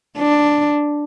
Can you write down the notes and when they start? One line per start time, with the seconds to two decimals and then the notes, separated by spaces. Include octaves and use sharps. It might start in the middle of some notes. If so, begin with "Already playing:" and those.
0.18 D4